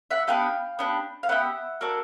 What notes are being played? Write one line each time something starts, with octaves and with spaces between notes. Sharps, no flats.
E5 F#5
B3 D4 G4 F5 G5
B3 D4 G4
F5
B3 D4 G4 E5 F#5
A#3 D4 F#4 A4